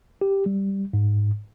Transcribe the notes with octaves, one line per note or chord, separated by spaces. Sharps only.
G4
G3
G#2